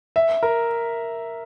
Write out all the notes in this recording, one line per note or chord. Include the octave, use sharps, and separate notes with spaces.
E5
A#4